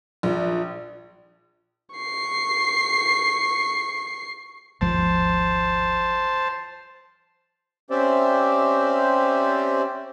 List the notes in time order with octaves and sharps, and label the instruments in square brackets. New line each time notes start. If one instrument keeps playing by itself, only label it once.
[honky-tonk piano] A#1
[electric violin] C#6 C7
[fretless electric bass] G#1 D#2 F3 [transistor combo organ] C5 A5
[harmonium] C4 C#4 G4 C5 D5 E5